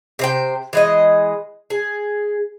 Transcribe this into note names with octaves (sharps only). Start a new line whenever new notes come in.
C3 C5 G5
E3 G#3 D#5
G#4